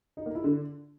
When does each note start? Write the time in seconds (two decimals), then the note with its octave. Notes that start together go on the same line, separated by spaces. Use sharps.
0.17 D#4
0.26 A#3
0.35 E4
0.44 D3